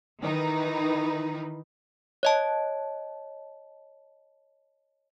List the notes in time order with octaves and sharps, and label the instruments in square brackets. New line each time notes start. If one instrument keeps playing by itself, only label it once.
[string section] D#3 E3 D#4 B4
[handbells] C#5 D#5 A5